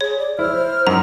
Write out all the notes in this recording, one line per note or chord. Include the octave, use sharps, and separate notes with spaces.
G#4 C#5
D5
E4 C5 F6
C5
F#2 D#4 A#5